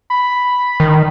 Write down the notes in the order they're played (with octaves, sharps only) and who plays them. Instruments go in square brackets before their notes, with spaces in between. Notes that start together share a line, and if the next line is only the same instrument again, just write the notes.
[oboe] B5
[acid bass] D#3